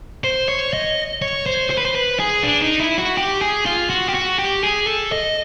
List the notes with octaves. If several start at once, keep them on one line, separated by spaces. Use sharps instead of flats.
C5
C#5
D#5
C#5
C5
C5
B4
C5
B4
G#4
D4
D#4
E4
F#4
G4
G#4
F4
F#4
G4
F#4
G4
G#4
A4
D#5